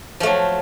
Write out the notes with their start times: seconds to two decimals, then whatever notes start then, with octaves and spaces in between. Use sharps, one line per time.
0.20 F3
0.23 A3
0.26 F#3